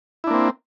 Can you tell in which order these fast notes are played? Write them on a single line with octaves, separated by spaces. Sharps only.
E4 D4 A#3 C4